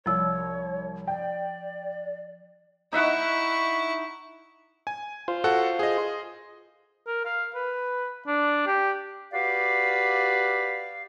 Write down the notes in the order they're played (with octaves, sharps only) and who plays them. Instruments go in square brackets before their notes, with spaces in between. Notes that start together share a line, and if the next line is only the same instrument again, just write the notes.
[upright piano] C2 [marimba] F3 E6 [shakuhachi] C#5
[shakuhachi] D5 [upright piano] G5
[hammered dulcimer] D#4 E5 F#5 [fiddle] E4 C#6
[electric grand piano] G#5
[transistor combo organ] F4 C5
[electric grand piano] F#4 A4 F#5
G#4 D#5
[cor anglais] A#4
F5
B4
D4
G4
[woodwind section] F#4 G4 B4 D5 F5